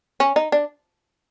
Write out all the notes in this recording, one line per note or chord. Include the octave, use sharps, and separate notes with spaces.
C#4
D#4
D4